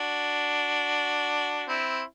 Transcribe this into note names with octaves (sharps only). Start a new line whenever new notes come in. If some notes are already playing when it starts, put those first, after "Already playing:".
Already playing: D4 F#4
C4 E4